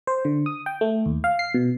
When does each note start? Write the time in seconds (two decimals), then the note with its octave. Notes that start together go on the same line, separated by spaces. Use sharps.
0.07 C5
0.25 D3
0.46 D#6
0.66 G5
0.81 A3
1.06 D#2
1.24 F5
1.39 C7
1.54 B2